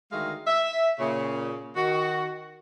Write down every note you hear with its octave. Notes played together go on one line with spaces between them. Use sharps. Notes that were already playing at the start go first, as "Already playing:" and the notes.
D3 D#3 G#3 A3 F#4 F5
E5
A#2 C#3
D#3 F#4